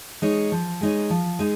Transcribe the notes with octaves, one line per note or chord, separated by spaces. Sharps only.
G#3 D#4 C#5
F3
G#3 D#4 C#5
F3
G#3 D#4